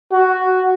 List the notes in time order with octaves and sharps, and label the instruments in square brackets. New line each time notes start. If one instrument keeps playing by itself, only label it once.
[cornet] F#4